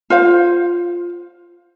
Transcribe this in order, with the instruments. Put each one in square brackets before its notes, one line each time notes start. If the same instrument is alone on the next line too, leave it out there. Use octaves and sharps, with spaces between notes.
[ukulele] F4 C5 F5